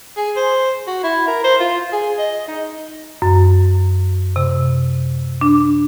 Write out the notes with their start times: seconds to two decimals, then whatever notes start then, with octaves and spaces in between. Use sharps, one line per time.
0.17 G#4
0.36 C5
0.87 F#4
1.03 E4
1.27 A#4
1.44 C5
1.60 F4
1.93 G#4
2.19 D#5
2.48 D#4
3.22 F#2
4.36 C3
5.41 D4